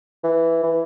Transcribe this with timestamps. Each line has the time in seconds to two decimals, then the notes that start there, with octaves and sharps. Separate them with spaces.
0.24 E3
0.63 E3